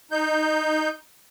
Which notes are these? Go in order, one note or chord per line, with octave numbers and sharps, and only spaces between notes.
D#4 G6